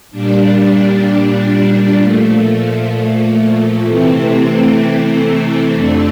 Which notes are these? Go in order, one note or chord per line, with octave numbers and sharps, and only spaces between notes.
A#2 G3 D4
A#2 F3 A3
C3 E3 A3 C4
F2 D3 A3 D4